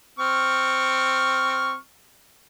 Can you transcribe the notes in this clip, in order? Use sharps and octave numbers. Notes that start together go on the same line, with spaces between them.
C4 C#6 F6